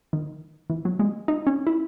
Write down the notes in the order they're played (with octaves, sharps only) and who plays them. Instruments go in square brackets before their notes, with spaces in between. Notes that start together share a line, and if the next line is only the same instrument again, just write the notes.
[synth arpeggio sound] D#3
E3
F#3
G#3
D#4
C#4
E4